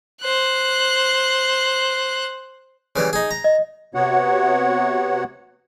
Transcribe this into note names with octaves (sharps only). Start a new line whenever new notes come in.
C5 F#6
C#3 E3 G3
D#4 G#4
A#5
D#5
C3 B3 F#4 C#5 F#5